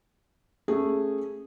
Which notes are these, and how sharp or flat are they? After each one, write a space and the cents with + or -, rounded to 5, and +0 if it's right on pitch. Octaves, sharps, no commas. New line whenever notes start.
A3 +0 C#4 -15 G#4 -10